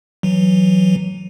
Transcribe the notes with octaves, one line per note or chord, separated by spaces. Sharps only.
E3 F#3